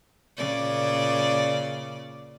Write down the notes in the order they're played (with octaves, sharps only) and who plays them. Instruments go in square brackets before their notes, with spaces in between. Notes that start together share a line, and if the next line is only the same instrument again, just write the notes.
[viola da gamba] A#2 C#3 D5